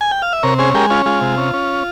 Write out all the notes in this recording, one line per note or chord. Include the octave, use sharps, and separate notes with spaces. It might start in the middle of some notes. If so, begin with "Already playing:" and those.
G#5
G5
F5
E5
C3 A#4 C#5
C#4 G#4 C5
G#3 G4 A#4
C#4 F4
G#3 F4
C3
C#4
C#4